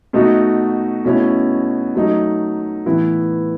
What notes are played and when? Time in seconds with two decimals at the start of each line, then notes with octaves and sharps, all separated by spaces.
0.13 B2 A3 D#4 F#4
1.05 B2 A3 C#4 E4
1.96 F#3 A3 D#4
2.86 A2 E3 B3 E4